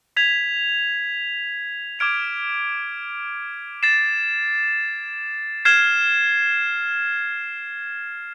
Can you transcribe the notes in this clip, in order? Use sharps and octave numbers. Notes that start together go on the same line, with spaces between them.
G#6 B6 F7
D6 F6 G#6 D7 F7
A6 C7 E7
F6 G#6 C7 E7